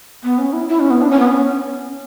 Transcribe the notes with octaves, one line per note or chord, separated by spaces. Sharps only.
B3
C#4
E4
E4
C#4
B3
D4
C#4
B3
C#4